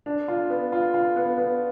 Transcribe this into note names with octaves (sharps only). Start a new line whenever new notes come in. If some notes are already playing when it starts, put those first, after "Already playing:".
D4
F4
B3
F4
F4
B3
B3